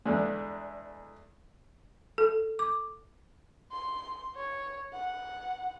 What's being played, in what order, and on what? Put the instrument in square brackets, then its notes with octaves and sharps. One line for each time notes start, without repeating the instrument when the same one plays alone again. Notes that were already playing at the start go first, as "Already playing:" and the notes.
[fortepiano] E2 D3 G3 G#3
[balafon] A4
D6
[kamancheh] C6
C#5
F#5